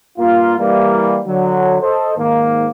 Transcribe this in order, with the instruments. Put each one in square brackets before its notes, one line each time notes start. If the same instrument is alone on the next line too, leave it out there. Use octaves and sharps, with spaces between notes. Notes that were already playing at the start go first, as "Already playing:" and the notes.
[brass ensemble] G2 A#3 F4
E3 G3 A#3
D3 F#3
A4 C5 D#5
G#2 D#3 A#3